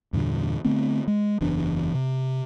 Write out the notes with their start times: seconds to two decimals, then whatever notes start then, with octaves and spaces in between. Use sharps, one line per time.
0.13 E2 G2 A#2 D3
0.65 D3 A3 B3 C4
1.07 G#3
1.41 F#1 E2 E3 D4
1.94 C3